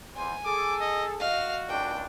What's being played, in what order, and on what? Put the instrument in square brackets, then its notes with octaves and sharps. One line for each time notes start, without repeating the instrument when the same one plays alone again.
[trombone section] E2 C5 [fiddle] G#5
[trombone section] G#4 A4 [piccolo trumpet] D6
[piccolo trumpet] D#5
[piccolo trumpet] F#4 [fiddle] D#5 F5
[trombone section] G#1 C#2 D4 [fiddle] G5